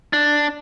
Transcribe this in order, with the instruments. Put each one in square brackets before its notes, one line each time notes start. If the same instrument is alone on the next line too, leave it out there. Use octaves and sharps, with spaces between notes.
[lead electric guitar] D4